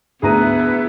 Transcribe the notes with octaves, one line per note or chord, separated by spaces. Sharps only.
D2 B3 E4 G#4 B4 A#5 F#6 D#7